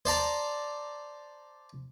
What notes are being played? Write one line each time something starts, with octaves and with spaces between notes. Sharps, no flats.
C5 D5 A5 A#5